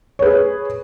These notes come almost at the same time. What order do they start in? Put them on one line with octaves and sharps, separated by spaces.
C#5 B4 G#4